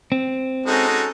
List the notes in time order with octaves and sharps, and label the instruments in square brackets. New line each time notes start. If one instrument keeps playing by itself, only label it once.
[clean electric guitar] C4
[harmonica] G#3 D#4 F#4 [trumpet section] C#4 A4